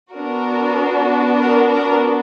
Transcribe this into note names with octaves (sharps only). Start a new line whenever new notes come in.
B3 D4 F#4 A#4
A#4
A#4